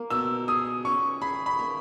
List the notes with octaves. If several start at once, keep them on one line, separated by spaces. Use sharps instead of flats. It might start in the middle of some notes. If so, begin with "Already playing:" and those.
Already playing: A#3
B2 E6
G#4 D#6
C#4 C#6
G#4 B5
B5
A#3